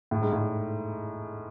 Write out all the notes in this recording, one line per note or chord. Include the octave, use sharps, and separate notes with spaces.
A2
G#2
A2